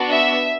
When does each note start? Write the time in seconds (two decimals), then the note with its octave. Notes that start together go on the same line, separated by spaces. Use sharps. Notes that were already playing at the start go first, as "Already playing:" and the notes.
Already playing: B3 D4 F#4
0.10 E5